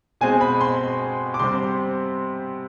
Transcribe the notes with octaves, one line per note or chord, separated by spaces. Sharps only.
B2 G#3 C4 G#5
B5
C6
D6
C3 G3 C4 C6